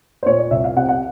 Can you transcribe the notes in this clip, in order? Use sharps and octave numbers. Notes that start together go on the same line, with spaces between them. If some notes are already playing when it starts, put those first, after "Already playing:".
C5
A#2 C#5
D5
C2 E5
F5
C3 F#5
F#5